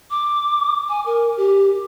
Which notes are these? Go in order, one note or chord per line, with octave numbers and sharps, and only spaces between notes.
D6
G#5
A#4
G4